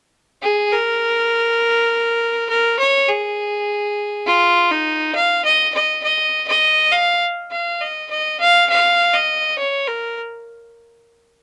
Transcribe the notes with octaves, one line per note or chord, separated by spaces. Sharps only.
G#4
A#4
A#4
C#5
G#4
F4
D#4
F5
D#5
D#5
D#5
D#5
F5
F5
D#5
D#5
F5
F5
D#5
C#5
A#4